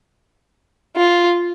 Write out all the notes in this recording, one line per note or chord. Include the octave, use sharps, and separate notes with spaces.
F4